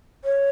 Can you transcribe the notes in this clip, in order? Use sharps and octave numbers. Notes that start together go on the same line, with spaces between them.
C#5